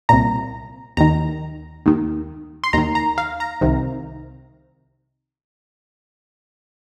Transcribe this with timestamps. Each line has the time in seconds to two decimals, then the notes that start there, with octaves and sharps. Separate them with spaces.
0.09 C2 A#2 A#5
0.97 D#2 D#3 A#5
1.86 D#2 D#3
2.64 C6
2.73 D#2 D#3 A#5
2.95 A#5
3.18 F5
3.40 A#5
3.61 C2 C3 D#3